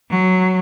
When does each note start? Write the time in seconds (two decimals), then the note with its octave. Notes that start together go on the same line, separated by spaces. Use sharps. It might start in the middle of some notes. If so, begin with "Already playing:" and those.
0.10 F#3